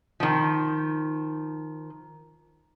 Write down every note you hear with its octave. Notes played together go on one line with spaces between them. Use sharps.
D#3 F3